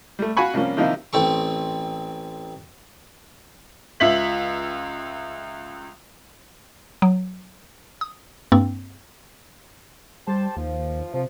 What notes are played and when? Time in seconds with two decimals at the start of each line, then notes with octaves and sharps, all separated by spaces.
0.19 G3 A3
0.37 F#4 F5 F#5 G#5 B5 C#6
0.54 C3 F3 G3 A#3 C#4
0.77 C3 D#3 F3 A#3 D#4 E4
1.13 A1 C4 A4 C#6
4.00 C#2 F4 E5 B6 F#7
7.02 F#3
8.01 D#6
8.52 G2 A#3 C4
10.28 G3 G4 C5 A5
10.57 D#2 F3
11.14 C3 F3